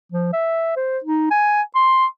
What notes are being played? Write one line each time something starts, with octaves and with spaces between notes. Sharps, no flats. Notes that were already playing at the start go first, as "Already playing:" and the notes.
F3
E5
C5
D#4
G#5
C6